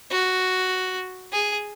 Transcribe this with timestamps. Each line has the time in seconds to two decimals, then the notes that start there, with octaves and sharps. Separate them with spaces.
0.10 F#4
1.32 G#4